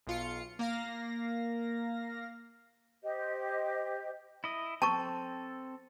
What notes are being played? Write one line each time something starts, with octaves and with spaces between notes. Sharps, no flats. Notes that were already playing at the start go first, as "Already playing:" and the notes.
B1 F4 C#7
A#3 F5 A#6
G4 C5 D#5
E4 D#5
C4 A4 A5 A#5 C#6